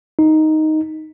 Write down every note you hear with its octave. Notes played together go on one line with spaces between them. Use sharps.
D#4